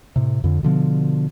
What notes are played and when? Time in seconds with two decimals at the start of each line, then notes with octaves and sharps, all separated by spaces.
0.16 A2 C3
0.44 F2 D3
0.63 B2 D3 F3 B3